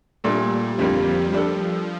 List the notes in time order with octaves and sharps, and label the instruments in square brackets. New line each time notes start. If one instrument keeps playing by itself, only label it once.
[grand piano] A#2 A3 D4 [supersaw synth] G3
[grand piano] F2 D3 G3 A#3 [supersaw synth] F3
[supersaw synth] F3 [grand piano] G3 D4 A4